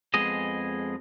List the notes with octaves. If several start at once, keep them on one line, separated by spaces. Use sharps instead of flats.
F2 G#3 B3 G#4 D#5